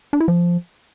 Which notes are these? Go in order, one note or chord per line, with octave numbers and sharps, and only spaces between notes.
D4
E4
F3